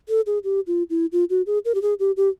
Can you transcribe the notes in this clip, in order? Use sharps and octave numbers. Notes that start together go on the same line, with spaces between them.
A4
G#4
G4
F4
E4
F4
F#4
G#4
A#4
G4
G#4
G4
G4